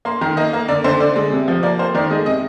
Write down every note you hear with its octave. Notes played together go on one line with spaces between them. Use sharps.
A#3 C6
D#3 A#5
A#3 D#5
A#3
D3 D5
D3 C5
D3 D5
G#3
C3
F3
A#3 D5
A#3 C5
D#3 D5
G#3 D#5
C3 D#5